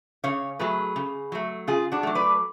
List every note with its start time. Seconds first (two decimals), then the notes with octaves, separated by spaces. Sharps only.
0.24 C#3 C#5 F5
0.59 F#3 A3 G#4 B4
0.96 C#3
1.32 F#3 A3
1.67 C#3 F4 G#4
1.92 D4 F#4
2.03 F#3 A3
2.15 B4 D5